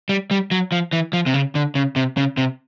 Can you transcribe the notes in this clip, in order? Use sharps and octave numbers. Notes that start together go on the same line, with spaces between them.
G3
G3
F#3
F3
E3
F3
C3
C#3
D3
C#3
C3
C#3
C3